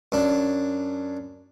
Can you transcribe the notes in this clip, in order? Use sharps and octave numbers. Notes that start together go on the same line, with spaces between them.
F#2 D4